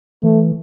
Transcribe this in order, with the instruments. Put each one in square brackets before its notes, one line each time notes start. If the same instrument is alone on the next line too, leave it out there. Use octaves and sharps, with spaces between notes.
[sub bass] E3 [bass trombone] A3